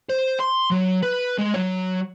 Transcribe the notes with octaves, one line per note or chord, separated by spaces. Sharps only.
C5
C6
F#3
B4
G#3
F#3 C#5